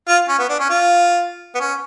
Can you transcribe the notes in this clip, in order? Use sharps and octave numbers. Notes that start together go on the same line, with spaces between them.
F4
C#4
B3
D4
C#4
F4
B3
C#4